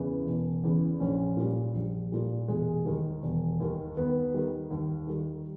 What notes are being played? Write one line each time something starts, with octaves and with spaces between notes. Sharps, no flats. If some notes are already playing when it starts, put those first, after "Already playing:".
Already playing: E2 C#3 E3
E1
E2 C#3 E3
A#1 C#4
A#2 G3
A#1
A#2 G3
E1 G#3
D#2 D#3 G3
E1
D#2 D#3 G3
D#2 B3
D#3 G3
D#2
D#3 G3